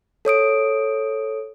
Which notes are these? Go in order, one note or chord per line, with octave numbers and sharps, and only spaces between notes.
A4 C#5 D#6 D7